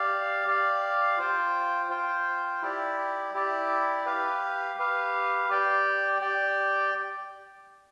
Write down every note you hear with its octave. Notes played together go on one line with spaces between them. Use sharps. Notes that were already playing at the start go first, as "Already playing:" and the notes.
Already playing: G4 D5 F5
G4 D5 F5
F4 C5 G5
F4 C5 G5
E4 G4 D5
E4 G4 D5
G4 B4 F5
G4 B4 F5
G4 D5 G5
G4 D5 G5